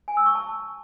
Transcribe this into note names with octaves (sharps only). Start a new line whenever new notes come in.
G#5
E6
C#6
A5